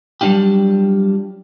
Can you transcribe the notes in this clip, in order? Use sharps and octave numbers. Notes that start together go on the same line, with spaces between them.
F#3 G3 A#3 D4 F4 G4